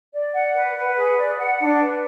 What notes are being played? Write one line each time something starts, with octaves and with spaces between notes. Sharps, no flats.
D5
F#5
B4
B4
G#4
D5
F#5
D4
B4